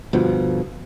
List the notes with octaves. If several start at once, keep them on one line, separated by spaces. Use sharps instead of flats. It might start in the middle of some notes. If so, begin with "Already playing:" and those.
G1 B2 F3